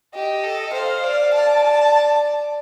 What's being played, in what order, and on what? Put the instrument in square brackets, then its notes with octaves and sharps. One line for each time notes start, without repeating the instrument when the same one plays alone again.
[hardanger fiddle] G4 [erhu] D#5
[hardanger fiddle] A4
[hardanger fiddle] C5 [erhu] F5
[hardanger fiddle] D5
[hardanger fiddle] D5 [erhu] A5
[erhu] A5